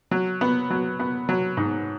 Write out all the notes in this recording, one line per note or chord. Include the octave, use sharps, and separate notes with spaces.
F#3
B3
F#3
B3
F#3
G#2